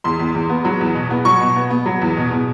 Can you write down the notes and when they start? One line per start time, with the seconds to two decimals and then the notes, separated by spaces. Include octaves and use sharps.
0.04 E2 C6
0.20 E2
0.35 E2
0.50 B3
0.65 F#3
0.81 E2
0.95 B2
1.10 B3
1.25 F#3 C#6
1.40 B2
1.56 B3
1.70 B3
1.86 F#3
2.01 E2
2.17 B2
2.31 B2